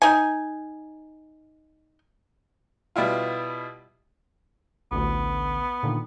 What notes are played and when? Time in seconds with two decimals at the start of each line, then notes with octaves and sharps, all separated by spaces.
0.02 D#4 G#5
2.96 B2 G3 E4 F4
4.92 A1 D2 B3
5.83 A#2 D3 D#3